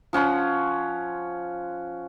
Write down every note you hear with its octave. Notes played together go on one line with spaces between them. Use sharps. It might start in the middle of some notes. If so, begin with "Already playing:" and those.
F3 C#4 F#5 C6